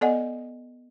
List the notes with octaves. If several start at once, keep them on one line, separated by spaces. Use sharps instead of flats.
B3 A4 D5 D#5 F#5 G#5